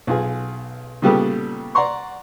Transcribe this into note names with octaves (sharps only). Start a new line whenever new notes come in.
B1 F4 G#4
A#2 C#3 G3 B3 G4 A4
D5 F#5 A#5 C6 C#6